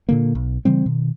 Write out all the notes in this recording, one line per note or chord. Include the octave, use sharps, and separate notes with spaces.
A#2 D3 A#3
B1
C#3 E3 G3 C4
B2 D#3